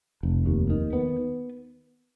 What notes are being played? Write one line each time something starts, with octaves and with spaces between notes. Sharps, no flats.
F1
D#2
D#3
B3